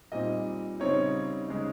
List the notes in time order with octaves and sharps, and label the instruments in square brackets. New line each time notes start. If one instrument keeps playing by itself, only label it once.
[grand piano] A#2 G3 C4 D#4 D#5
C#3 G3 C4 D#4 C#5
C#3 G#3 D#4